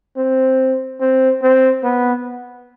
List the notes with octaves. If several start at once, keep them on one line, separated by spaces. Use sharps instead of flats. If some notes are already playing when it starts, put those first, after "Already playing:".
C4
C4
C4
B3